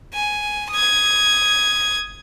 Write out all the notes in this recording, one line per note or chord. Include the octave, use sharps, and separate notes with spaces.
G#5
D#6 G#6